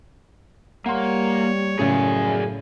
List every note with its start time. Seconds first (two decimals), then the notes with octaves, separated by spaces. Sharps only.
0.86 G3 A#3 C#5 F#5 C6
1.79 F#2 A2 C#3 G#4 D5 G#5